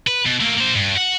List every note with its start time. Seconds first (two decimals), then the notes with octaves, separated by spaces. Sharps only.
0.07 B4
0.26 B2
0.41 A3 A#3
0.58 A#3 C5
0.75 G2
0.97 F#4 F#5